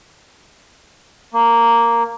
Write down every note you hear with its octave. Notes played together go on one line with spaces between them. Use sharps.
A#3